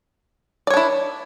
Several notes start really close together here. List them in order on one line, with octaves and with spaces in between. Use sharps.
D5 C#5 D4 E4